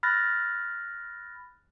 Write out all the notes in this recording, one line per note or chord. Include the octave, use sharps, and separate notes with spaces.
B5 F6 F#6 A6 A#6